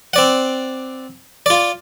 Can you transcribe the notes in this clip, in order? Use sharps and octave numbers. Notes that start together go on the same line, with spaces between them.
C4 D5 F#5
F4 D5